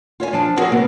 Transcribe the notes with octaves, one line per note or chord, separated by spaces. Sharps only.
F4 C#5 E5 G#5
F3 D4 A5
B3 C4 F#4 G#4 A#4 C#5
C3 A#3 B3